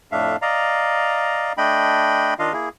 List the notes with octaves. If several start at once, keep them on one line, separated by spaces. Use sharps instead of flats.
F2 A2 A3 D4 E5 F5
D5 D#5 F5 A#5
A3 D4 D#5 G5 B5
D#3 D4 F4 D#5 F5
A#3 E4 G#4